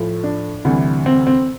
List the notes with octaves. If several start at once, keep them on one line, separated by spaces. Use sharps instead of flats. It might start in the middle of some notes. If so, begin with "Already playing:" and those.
Already playing: A2 F3 A3
D4
D2 C3 E3 G3
C4
C4